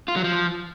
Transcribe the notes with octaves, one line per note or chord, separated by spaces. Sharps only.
F4
F#3
F3